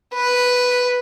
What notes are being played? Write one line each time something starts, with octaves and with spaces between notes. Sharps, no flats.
B4